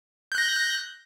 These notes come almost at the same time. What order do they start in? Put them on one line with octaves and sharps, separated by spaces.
G6 F#6 A#6